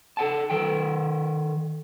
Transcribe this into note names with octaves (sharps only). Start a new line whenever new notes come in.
A4 F#5 A5
D#3 A4 G5